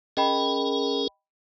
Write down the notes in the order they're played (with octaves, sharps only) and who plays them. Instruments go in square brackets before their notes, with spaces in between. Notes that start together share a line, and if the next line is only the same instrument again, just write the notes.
[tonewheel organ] C#4 G#4 A#4 [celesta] D#5 G5 B5